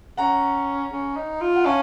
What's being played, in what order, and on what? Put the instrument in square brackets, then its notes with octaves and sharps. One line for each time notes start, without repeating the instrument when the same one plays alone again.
[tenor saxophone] C#4 [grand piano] F#5 A#5
[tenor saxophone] C#4
D#4
F4
[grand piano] F#5
[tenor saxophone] C#4 [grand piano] F5 A5